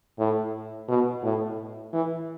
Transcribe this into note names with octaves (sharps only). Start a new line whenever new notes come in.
A2
B2
A2
E3